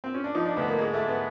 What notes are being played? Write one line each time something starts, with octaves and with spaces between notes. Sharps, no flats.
C4
C#4
D4
F3 D#4
D4
D2 B3
A#3
G#2 G#3
A3
G#2
B3